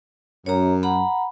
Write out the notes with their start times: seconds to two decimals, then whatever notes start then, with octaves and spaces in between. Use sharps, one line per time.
0.46 F#2 C#5 A#5
0.83 F#5 A#5 B5